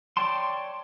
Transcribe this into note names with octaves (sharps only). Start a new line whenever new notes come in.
C#5 D5 G5 A5 C6